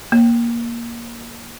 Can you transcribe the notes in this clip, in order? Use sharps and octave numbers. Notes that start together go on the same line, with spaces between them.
A#3